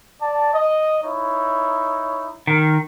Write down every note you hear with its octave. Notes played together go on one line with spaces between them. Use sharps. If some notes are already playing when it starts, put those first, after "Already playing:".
D5 A5
D#5
D#4 E4 C#5
D#3 A#4